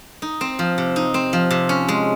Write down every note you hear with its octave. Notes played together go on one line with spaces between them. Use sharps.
D#4
C4
F3
C3
D#4
C4
F3
C3
C#4
G#3